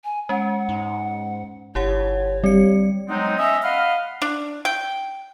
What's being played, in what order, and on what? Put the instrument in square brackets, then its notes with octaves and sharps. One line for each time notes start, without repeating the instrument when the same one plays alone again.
[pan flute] G#5
[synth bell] G#3 C#4 [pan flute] F#5
[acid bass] G#2
[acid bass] G1 [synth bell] E4 G4 F#5 [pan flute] C#5
[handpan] G3 [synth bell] C4 C#7
[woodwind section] F#3 G#3 B3 C4 D#4
C#4 D#5 E5
D#5 F5 F#5 B5 C6 F6
[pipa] D4
G5